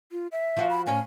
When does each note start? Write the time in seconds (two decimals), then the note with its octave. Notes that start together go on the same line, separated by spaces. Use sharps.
0.12 F4
0.32 E5
0.57 F3 F4 F#4
0.70 B5
0.87 A2 C#4 C#5 G#5